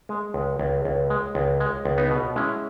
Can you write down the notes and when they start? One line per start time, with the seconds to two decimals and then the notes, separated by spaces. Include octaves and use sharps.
0.09 G#3
0.34 C#2
0.59 C#2
0.85 C#2
1.10 G#3
1.35 C#2
1.60 G#3
1.85 C#2
1.98 B3 D#4
2.11 B2
2.36 G#3 C#4 E4